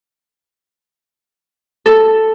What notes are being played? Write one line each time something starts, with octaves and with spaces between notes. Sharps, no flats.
A4